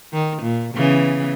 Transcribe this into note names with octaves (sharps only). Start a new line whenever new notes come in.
D#3
A#2
C#3 E3 B3